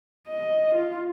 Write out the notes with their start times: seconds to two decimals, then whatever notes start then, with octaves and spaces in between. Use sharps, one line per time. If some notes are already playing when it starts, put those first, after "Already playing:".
0.28 D#5
0.75 F4